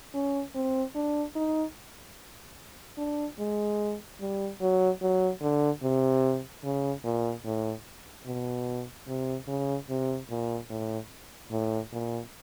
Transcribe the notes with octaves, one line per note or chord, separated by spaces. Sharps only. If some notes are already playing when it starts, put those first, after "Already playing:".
C#4
C4
D4
D#4
D4
G#3
G3
F#3
F#3
D3
C3
C#3
A#2
A2
B2
C3
C#3
C3
A#2
A2
A2
A#2